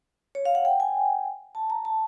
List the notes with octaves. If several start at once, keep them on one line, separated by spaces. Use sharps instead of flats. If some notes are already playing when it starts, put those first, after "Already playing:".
C#5
F5
F#5
G5
G#5
A5
A#5
A5